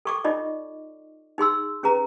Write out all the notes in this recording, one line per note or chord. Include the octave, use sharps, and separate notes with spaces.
A4 C#6 D6
D#4 F4 D5 D#5
D#4 G#4 C6 E6
C#4 G#4 B4 A#5